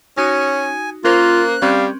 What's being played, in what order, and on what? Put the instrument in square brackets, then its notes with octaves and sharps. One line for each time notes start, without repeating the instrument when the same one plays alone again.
[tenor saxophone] C#4 [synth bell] D#4 F#4 D#6 [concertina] G#5
[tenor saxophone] A#3 [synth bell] C#4 A#4 C5 [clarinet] F4 [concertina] F#6
[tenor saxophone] G3 [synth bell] C4 C#4 [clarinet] F5